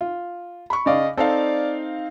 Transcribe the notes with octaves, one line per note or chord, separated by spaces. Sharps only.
F4
B5 C#6
C#3 D5 D#5 F5
C4 D#4 A4 D5 F5